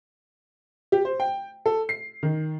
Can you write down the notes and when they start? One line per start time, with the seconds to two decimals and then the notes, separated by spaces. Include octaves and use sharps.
0.92 G4
1.05 C5
1.20 G5
1.66 A4
1.89 C7
2.23 D#3